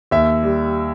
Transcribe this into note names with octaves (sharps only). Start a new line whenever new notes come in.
D#2 E5
G3